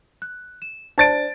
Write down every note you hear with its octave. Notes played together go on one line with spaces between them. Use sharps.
F#6
E7
D4 C5 D5 A5 A6 D7